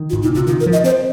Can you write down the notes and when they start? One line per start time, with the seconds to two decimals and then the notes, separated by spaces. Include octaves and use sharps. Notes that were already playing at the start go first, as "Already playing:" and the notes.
Already playing: D#3
0.10 F4
0.13 G#2
0.22 A#2 D#4
0.35 C3 F4
0.47 D#3 F4
0.60 A#4
0.66 F3
0.73 D#5
0.84 C4 C5